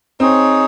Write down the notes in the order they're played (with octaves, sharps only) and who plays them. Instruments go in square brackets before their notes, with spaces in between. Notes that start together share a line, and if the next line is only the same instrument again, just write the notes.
[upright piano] C4 [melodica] D#4 G#4 C#5